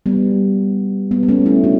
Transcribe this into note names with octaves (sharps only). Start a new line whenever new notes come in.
G3 B3
G3 B3
B3
A3 C#4
C#4 E4
D4 F#4